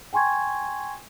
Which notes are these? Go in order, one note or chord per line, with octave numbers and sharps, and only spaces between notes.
G5 G#5 C6 C#6 G#6